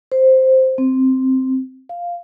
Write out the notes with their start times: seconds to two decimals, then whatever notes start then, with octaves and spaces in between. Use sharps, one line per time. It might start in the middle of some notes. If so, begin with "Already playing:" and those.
0.12 C5
0.78 C4
1.89 F5